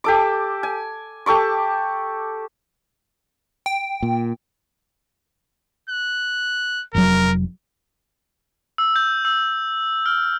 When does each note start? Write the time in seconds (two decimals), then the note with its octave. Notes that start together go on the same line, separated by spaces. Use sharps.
0.04 G4 A4 D6
0.63 G#5
1.26 G4 A4 C#6 D6
3.66 G5
4.03 A#2
5.89 F#6
6.94 F1 F#3 A#4
8.78 E6
8.96 G6
9.25 E6
10.06 F6